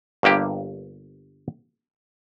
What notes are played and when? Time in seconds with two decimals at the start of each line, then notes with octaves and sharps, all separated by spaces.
0.23 G1 G2 A#3 G4